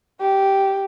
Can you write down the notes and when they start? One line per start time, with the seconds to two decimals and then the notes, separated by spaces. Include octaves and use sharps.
0.20 G4